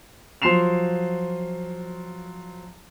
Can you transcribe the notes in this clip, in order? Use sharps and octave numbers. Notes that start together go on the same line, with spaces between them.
F3 F#3 C6 C7 E7 F7